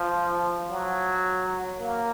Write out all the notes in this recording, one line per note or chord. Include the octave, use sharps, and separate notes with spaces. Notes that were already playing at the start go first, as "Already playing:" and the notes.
Already playing: F3
F#3
A#3